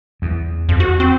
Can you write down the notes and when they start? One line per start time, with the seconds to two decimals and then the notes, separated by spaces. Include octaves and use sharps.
0.22 E2
0.69 F2
0.80 F#4
1.00 C4